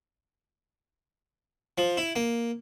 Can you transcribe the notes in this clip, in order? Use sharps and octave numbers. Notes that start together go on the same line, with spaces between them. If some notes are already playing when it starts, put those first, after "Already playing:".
F3
E4
A#3